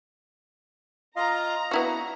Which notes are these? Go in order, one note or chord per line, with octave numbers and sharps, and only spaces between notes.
F4 D#5 F5 A#5
B3 D4 E4 F#4 C#6